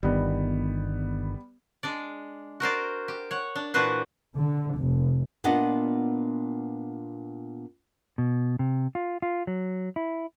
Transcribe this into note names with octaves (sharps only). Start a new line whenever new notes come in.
G1 D#3 G3 B3
G#3 D4 D5
F#4 A#4 C5 D5
G4
C#5 F#5
D4
A#2 E3 D4 F#4 B4 C5
D3
F1
A#2 B3 D4 F4 D#5 F#5
B2
C3
F4
F4
F#3
E4